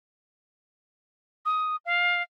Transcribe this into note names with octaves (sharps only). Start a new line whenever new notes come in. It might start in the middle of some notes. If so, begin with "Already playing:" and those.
D#6
F5